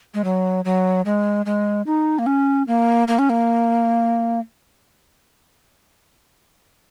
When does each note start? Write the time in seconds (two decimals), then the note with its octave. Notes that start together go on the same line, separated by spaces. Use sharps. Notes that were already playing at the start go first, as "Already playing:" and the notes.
0.14 G#3
0.24 F#3
0.65 F#3
1.05 G#3
1.46 G#3
1.86 D#4
2.19 A#3
2.26 C#4
2.67 A#3
3.08 A#3
3.19 C#4
3.29 A#3